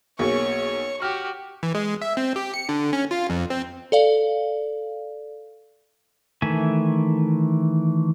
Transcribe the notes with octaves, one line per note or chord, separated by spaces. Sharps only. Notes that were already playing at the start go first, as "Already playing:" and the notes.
B1 A#3 G#4 C#5 C#6
F#4 G4 F6
E3
G#3
E5
C4
G4
C#7
D3
C#4
F4
F2
C4
A4 D5 F5
D#3 E3 A3 E5 G#5